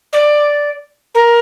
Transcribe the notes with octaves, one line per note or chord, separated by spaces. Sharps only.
D5
A#4